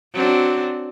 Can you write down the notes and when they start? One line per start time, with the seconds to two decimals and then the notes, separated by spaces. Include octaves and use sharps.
0.13 F#3 C4 D4